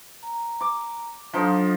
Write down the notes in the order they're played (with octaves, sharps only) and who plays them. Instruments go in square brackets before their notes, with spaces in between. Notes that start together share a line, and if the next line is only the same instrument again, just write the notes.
[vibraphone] A#5
[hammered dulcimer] D6
[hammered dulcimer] F3 D#4 F4 [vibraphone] F#3 D4 A4